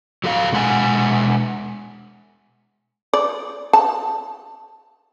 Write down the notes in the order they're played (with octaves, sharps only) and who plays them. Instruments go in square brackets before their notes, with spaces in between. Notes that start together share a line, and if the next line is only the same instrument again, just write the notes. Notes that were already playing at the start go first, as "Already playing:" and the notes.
[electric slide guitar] F#3 A4 F5
B2 G#3 F#5 G#5
[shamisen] D5
A5